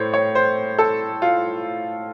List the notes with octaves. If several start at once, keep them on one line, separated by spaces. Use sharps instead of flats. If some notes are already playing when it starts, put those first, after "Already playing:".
Already playing: A2 A3 C5 C#5
C#5
C5
A4
F4